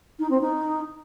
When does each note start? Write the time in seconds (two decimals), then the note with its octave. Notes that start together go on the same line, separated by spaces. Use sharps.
0.19 D#4
0.30 C4
0.41 D#4